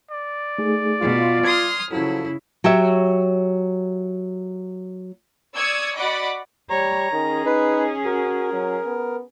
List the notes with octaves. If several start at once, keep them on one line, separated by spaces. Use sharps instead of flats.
D5
A3 D#4 G#4
B2 F4
C6 D#6 F6 G#6
C#3 F3 F#3 E4 A4
F#3 G4 C#5 E5
D5 C#6 D#6 E6 G#6 C#7
F#4 D5 D#5 F#5 B5 D6
G3 C#5 A#5
D#3 C#4 G#4
D#4 B4
F#4 A#4
F#3
B3